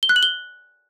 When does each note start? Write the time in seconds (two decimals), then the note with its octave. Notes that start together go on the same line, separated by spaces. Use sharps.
0.03 G7
0.09 F#6
0.16 F#7
0.23 G7